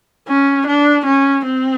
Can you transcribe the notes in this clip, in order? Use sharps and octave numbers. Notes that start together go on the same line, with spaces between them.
C#4
D4
C#4
C4